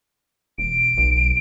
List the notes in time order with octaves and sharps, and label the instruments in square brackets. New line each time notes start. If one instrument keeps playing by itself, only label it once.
[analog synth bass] E1 [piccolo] D7
[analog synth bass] B1